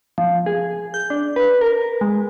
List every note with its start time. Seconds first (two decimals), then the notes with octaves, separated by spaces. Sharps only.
0.18 F3
0.46 G#4
0.94 G6
1.10 D4
1.36 B4
1.61 A#4
2.01 G#3